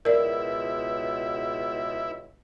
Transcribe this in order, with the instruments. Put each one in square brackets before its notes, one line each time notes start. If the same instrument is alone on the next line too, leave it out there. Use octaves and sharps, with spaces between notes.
[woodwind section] C#2 B2 [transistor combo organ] E4 [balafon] A#4 D5